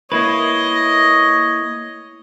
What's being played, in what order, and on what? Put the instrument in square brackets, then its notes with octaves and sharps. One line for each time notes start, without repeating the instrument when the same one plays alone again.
[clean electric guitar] A#3 E4 B4 [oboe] C#5 [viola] D#5